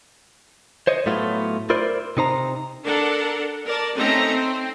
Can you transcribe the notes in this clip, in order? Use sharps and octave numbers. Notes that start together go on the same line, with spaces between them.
C5 C#5 D#5
A2 F#3 A3 B3 F4
E4 F4 A#4 C5 D5
C3 D#4 C5 A#5
D4 A4 A#4 F#5
A#4 D5 A5
A3 C4 C#4 D#4 A#5
C4